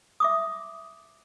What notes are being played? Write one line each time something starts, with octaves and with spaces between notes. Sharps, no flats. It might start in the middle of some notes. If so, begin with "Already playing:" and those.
E5 D6 D#6